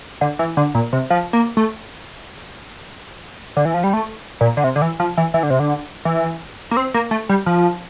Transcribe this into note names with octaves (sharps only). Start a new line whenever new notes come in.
D3
E3
D3
A#2
C3
F3
A#3
A3
D3
E3
F3
G3
A3
A#2
D3
C3
D3
E3
F3
E3
E3
D3
C3
D3
E3
A#3
C4
A#3
A3
G3
F3